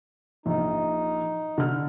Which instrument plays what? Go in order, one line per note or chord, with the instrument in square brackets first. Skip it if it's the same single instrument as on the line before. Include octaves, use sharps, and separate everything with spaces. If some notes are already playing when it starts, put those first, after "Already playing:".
[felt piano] A#1 [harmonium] D#4
[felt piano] D3 F6